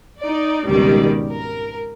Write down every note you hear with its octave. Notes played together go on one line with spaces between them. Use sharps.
D#4 D5
G#1 C#2 B2 D#3 G3 D5
A#4